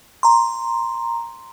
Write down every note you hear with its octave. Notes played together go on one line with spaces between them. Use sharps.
A#5 C6